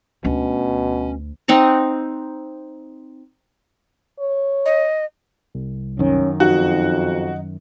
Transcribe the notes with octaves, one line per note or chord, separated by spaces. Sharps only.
D2 B2 C#4
C4 D#4 F#5 A#5
C#5
D#5
C2
F#2 D#3 C#4
F2 D#4 F#4